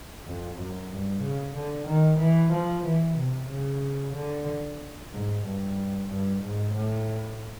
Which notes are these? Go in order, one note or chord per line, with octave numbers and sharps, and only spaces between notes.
F2
F#2
G2
C#3
D3
D#3
E3
F3
E3
C3
C#3
D3
G#2
G2
G2
G#2
A2